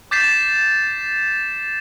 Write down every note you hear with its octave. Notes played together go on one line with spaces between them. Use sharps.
D6 G6 A6 B6 C7 E7